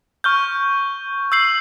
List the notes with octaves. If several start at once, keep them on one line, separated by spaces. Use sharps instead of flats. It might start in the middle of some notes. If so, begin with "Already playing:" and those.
C#6 F6 G6
E6 G6 C7 F#7